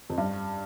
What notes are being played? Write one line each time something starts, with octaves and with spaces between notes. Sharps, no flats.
F2
G2